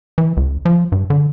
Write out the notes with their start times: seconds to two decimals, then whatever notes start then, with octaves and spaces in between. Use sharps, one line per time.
0.18 E3
0.37 C#2
0.65 F3
0.92 G2
1.10 D3